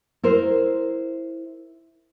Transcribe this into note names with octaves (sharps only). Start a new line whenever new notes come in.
E4 A#4 C5